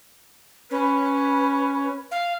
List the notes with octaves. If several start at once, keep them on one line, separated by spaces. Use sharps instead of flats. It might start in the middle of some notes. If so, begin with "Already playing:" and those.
C#4 B4
F5